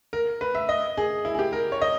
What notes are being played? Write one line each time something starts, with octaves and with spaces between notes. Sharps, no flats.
A#4
B4
E5
D#5
G#4
E4
G#4
G4
A#4
C#5
D#5